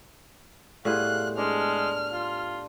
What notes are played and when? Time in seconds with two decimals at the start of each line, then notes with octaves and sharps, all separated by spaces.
0.85 A2 G3 B3 G#4 C5 F5 F#6
1.37 G#3 D4 C5 F6
2.12 F4